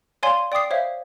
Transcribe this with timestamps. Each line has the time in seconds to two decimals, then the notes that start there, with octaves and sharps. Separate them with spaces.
0.23 C#5 D5 F5 G#5 C6
0.52 D5 G5 D6 D#6 C7
0.70 C5 C#5 E5 F5